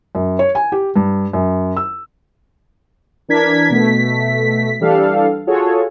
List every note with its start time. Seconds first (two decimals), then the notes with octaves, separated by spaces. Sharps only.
0.15 F#2
0.39 C#5
0.55 G#5
0.72 G4
0.96 G2
1.33 F#2
1.77 E6
3.28 E3 D4 A#4 G#6 B6
3.70 B2 A3 B6
4.80 E3 G3 D4 A4 F5
5.47 F4 F#4 G#4 A4 C#5